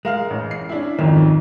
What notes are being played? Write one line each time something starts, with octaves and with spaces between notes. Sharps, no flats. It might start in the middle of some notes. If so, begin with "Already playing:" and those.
G#3 A#4 F5 F6
A1
C7
C#4 D4 E4
B1 F2 G#2 D#3